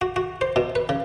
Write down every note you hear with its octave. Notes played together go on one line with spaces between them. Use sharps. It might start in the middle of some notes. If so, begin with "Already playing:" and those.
F#4
F#4
C5
B2
B4
C#3